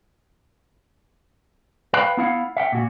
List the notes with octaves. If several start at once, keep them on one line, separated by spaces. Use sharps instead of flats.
B4 F5 G5 B5
B3 E4 F5 F#5
E5 F#5 G5
A#2 F#4